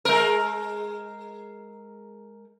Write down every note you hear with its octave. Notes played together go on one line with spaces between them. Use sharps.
G#3 A#4